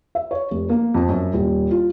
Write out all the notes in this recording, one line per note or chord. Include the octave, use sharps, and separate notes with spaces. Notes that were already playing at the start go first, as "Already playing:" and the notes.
E5
C#5
F1
A#3
F2
F#2
D#1
F4